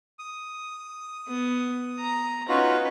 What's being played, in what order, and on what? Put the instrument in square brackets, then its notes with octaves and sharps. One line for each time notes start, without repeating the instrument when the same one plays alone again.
[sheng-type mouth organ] D#6
[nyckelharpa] B3
A#5
[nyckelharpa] C#4 B4 [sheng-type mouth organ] D#4 F4 F#4